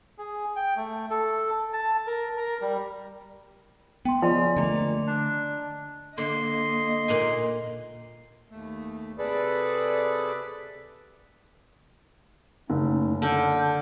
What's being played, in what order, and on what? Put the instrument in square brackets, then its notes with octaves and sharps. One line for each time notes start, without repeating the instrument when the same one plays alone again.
[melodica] G#4
G5
A3
A4
A5
A#4
A#4
G3
[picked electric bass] B3 [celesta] G5 C6
[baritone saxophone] C#3 [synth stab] F3 [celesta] D5 D#5 C6
[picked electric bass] D3 A3 [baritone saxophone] A#3
[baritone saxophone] D4
[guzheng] D3 [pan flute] A#3 [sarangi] D#5 [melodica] C6
[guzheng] A#2 D#4 G#5
[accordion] D#2 A3
C3 G#4 A4 B4 D5 B5
[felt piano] F#1 [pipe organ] A3 C#4 D#4
[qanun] D3 [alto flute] A5 [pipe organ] E6 F6 G6